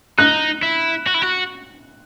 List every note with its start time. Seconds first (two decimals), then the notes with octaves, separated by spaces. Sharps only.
0.18 D#4 F#6
0.63 E4
1.07 F#4
1.14 E4
1.22 F#4